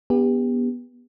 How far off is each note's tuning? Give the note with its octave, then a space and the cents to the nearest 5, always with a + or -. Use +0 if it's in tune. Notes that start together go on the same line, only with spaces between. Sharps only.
B3 -15 D4 -35 G4 +30